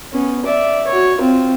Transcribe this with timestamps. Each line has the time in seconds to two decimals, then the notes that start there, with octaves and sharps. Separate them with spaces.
0.13 B3 C#4
0.46 D5 E5
0.87 F#4 C#5
1.18 C4 F4